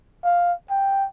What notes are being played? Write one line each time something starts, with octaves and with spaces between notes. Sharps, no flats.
F5
G5